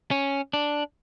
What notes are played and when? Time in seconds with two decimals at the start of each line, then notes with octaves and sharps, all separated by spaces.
0.11 C#4
0.53 D4